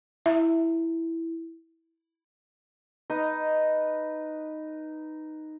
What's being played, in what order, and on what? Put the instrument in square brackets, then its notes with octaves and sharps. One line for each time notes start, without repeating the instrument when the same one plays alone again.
[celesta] E4 [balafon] E5
[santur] D#4 B4 D#5 D#6